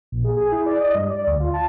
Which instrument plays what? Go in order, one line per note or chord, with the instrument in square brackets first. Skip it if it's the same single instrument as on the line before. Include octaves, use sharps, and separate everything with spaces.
[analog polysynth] A#1
G#4
G#4
E4
D5
D#5
G2
D5
D2
F4
A5